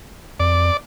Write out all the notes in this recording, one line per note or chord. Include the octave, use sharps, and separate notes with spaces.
F2 D5